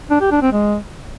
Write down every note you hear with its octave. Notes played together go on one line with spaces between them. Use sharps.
D4
G4
D4
C4
G#3